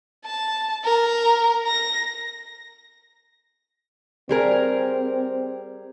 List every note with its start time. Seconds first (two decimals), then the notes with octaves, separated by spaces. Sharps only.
0.25 A5
0.84 A#4
1.67 A#6
4.29 G3 C4 G#4 A#4